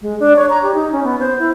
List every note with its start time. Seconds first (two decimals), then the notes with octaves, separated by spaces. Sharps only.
0.01 G#3
0.20 D4
0.36 C#5
0.50 A#5
0.62 G4
0.74 D#4
0.92 C#4
1.04 B3
1.20 C5
1.39 E4